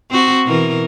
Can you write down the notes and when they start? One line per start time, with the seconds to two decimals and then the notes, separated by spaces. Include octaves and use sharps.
0.10 C4 F#4
0.46 B2 E3 A#4